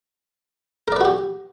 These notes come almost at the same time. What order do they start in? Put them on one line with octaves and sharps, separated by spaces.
A#4 D5 B4 F#4 G4